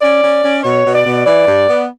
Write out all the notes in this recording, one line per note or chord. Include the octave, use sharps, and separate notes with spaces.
C#4 D5
C#4
C#4
B2 C#5
B2
D5
B2
E3 D5
G2
B3